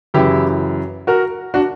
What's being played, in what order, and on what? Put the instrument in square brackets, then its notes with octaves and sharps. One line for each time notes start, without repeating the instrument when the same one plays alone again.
[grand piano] F#2 C#3 E3 E4 G4
F#4 A#4
D4 F#4